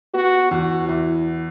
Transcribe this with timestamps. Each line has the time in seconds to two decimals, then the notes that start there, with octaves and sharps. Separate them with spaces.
0.14 B3 F#4
0.51 E2 F#4
0.89 E2 E4